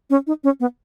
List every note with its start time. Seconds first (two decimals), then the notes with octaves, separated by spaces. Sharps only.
0.10 C#4
0.27 D#4
0.44 C#4
0.60 B3